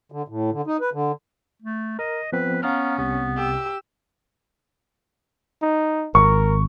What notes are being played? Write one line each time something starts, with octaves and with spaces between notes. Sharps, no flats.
D3
A2
D3
D#4
B4
D3
A3
A#4 D#5
F3 B3 C4 B4
B3 C#4 F5 A#5 F6
C2 C3 B3
G4 E6
D#4
G#1 A#4 C#6